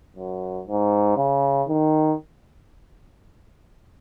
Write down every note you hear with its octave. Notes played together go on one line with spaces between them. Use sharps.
F#2
G#2
C#3
D#3